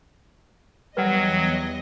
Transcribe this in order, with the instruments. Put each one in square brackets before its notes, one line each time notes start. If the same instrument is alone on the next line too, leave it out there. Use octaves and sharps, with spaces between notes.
[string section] E2 D#5 [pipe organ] F#3 [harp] G3 [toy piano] B4 F#5